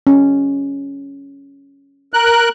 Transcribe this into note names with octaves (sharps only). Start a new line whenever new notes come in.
C#4
A#4 F#6